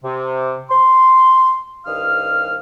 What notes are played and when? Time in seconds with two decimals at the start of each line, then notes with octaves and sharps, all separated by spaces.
0.04 C3
0.70 C6
1.86 C2 G2 D#3 F5 D#6 F6